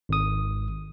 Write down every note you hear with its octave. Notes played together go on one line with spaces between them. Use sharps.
G#1 D#6